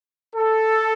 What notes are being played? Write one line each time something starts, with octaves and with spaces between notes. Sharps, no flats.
A4